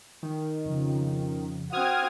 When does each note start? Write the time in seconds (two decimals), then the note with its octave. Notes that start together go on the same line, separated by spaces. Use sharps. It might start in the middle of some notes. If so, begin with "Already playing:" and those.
0.23 D#3
0.64 F2 C#3 F3
1.72 C4 F#4 D#6 F6 G#6